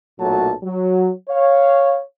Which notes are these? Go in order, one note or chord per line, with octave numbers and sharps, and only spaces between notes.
B1 A#2 F#3 A3 F#4 A5
F#3
C#5 F5